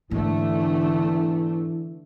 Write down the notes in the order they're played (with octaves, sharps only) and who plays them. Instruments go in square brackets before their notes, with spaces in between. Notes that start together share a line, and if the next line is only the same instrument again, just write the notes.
[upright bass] G#2 B3 [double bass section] D3 A3 [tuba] E3